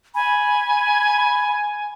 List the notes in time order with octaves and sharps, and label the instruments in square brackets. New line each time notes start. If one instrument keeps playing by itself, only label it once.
[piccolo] G#5 [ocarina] B5